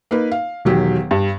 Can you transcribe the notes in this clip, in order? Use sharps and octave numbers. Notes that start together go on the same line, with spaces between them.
A#3 D#4 B4
F5
E1 D#3 F#3 G4
G2